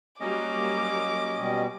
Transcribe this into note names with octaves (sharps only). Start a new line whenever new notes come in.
F#3 G3 A#3 C#4 D#5 D6
B2 G3